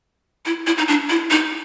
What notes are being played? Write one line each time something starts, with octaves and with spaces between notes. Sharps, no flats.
E4
E4
D#4
D4
E4
D#4